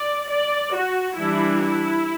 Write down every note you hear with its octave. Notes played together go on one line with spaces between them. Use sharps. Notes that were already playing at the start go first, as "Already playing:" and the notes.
Already playing: D5
D5
F#4
E3 G3 D4 E4
E4